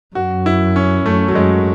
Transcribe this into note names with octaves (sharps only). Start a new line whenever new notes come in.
F#2 F#4
E4
C#4
F#2 A3
F#3
F#2 G#3